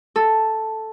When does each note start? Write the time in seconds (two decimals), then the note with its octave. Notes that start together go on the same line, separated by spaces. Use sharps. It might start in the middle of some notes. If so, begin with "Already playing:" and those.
0.16 A4